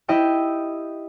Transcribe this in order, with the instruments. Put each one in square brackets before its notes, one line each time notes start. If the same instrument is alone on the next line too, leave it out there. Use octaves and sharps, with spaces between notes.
[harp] E4 G4 D#5 G5 E6